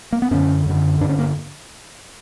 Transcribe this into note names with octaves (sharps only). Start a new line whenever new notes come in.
A#3
B3
F#2 D3 C#4
F#2 D3
G2 D3 D4
C#4
A#3